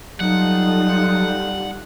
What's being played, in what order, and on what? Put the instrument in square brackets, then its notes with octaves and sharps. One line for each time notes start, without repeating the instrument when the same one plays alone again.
[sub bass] F#3 [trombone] G3 [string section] D#4 F4 A4 [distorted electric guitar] F#5